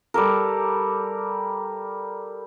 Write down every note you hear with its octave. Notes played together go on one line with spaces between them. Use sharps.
G3 G4 A4 A#4